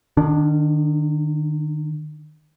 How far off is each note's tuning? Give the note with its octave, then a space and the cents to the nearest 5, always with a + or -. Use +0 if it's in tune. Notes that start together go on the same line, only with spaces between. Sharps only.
D#3 -30 D4 +0